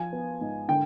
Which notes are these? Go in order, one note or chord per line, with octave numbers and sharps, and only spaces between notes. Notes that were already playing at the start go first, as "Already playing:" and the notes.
Already playing: F3 G#5
B3
G#2
D3 G5